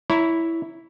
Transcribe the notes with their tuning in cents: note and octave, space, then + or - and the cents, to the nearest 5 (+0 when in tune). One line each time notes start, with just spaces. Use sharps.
E4 +0 C#5 +25 A#5 +0